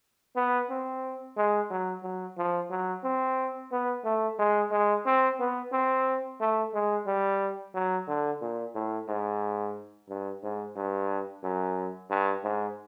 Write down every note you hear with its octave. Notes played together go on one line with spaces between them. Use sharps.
B3
C4
G#3
F#3
F#3
F3
F#3
C4
B3
A3
G#3
G#3
C4
B3
C4
A3
G#3
G3
F#3
D3
A#2
A2
G#2
G2
G#2
G2
F#2
G2
G#2